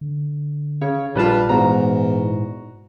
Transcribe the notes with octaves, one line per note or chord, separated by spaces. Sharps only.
D3
C#3 C#5
A#1 A#2 G3 F4 B4 A5
E2 G#2 F#4 A#5